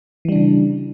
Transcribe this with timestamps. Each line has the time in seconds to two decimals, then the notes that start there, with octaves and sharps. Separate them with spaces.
0.25 E3
0.29 G3
0.32 D4
0.36 C#3